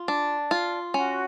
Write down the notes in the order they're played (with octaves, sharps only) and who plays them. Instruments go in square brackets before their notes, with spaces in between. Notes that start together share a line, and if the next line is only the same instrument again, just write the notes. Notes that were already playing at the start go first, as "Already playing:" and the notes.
Already playing: [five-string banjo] F4
D4
F4
[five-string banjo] C#4 [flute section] F#4